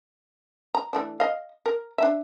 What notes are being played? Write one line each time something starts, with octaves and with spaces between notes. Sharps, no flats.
A#5
E3 A3 D4
D#5 F5
A#4
D4 E5